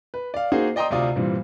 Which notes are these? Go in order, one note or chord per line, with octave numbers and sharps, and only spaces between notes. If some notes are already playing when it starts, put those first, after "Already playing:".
B4
D5 F5
A#3 D#4 F#4 G#4 C5
D5 D#5 G5 A#5 C6 D#6
D2 C3 F4 D5 D#6
G2 A#2 E3 G3 C4